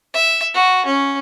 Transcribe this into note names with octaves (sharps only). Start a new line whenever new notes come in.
E5
F#4
C#4